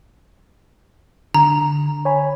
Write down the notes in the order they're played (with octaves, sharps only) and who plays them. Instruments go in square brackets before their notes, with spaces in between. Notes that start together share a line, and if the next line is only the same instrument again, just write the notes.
[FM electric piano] D3 [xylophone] A#5
[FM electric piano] C#5 G#5 B5